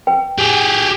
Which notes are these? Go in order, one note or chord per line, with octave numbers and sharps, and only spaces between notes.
B4 G5
G4 G#4